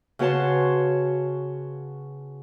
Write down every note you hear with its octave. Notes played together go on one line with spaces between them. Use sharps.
C#3 B3 F#4 C#5 A5 C6